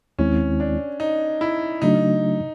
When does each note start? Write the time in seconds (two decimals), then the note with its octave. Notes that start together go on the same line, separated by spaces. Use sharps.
0.19 D#2 D#3 G#3 C4 C#4 E4
0.60 D4
1.00 D#4
1.41 E4
1.82 C#3 F#3 A3 D4 D#4 F#4